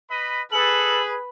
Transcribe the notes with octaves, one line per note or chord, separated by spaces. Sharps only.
B4 D#5 B5
G#4 A4 B4 F#7